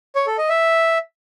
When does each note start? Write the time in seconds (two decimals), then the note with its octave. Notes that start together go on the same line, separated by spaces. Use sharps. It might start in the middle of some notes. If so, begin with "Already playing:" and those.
0.16 C#5
0.27 A4
0.38 D#5
0.49 E5